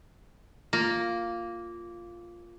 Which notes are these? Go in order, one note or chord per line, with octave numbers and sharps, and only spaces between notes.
A#3 F4